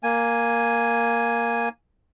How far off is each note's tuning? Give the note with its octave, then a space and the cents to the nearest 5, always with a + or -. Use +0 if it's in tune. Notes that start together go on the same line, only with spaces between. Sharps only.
A#3 +0 G#5 +0